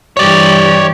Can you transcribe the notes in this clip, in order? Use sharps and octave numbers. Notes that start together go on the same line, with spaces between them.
G2 E3 G4 C#5 D5